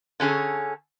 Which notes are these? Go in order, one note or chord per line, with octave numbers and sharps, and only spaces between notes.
D3 C#4 G#4 A4